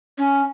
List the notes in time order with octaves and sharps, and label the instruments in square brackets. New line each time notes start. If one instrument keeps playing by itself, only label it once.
[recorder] C#4